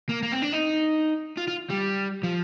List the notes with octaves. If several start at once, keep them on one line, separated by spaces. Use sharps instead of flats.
A#3
A#3
C4
D4
D#4
F4
F4
G3
F3